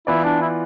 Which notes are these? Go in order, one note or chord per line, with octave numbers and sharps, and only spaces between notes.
E3 B3 E4 F4 B4 D5
D4
E4